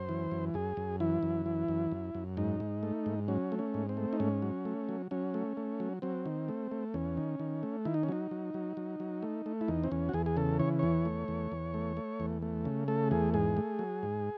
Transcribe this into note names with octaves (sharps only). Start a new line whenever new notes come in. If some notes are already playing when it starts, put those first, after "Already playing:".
Already playing: F#2 C5
E3
F#2
F#2 G#4
F#2
E3 E4
F#2
E3
F#2
F#2
F#2
G#2 D#4
G#2
A3
G#2
F#3 C#4
A3
C#4
G#2
C4
A3
D#4
G#2 C#4
F#3
A3
F#3
F#3 C#4
A3
A3
F#3
F#3 C4
D#3
A3
A3
E2 C#4
D#3
D#3
A3
D#3 E4
D#4
C#4
F#3 D#4
F#3
F#3
F#3
F#3
A3
A3
E4
E2 D#4
C4
E2 C#4
F#4
E2 G#4
G#4
C#3 A4
E3 C#5
E2 C#5
A3
E2
E2
A3
A3
E2
A3
C#3
A3 A4
E2 G#4
G#2 G#4
A3
F#3
G#2